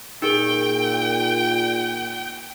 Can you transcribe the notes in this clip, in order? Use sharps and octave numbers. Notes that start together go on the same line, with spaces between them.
A#2 D#4 G#4 A#4 G5